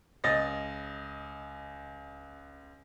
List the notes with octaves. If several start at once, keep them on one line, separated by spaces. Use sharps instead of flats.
C#2 D#5 A6 A#6